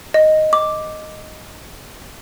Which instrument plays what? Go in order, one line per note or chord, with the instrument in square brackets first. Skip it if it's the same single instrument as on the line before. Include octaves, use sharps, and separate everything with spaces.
[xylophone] D#5
D6